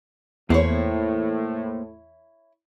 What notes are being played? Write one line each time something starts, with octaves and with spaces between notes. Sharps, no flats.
E2 A2 A#3 E4 C5 C#5